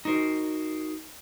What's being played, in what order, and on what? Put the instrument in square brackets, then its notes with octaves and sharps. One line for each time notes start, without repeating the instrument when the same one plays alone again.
[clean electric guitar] D#4 F#4 A#4 C5